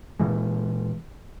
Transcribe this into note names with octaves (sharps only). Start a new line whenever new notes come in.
A#2 E3 G#3